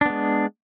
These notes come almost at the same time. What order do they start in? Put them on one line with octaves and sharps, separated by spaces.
D4 B3 G#3